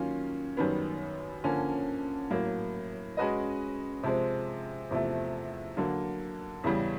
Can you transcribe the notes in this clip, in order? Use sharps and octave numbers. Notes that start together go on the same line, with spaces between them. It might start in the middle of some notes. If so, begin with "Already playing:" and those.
Already playing: D#3 F#3 A#3 C#4 F4
F#2 D#3 G3 B3
D3 F3 A#3 C#4
A2 F#3 A#3
G#3 C#4 F#4 B4 D#5
C3 F3 G#3 C4
E2 C3 F3 A3
D3 F#3 A#3
E2 C#3 E3 G3